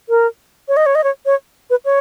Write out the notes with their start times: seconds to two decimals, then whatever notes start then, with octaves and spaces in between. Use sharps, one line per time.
0.09 A#4
0.68 C#5
0.77 D#5
0.86 C#5
0.95 D#5
1.04 C#5
1.26 C#5
1.70 B4
1.85 C#5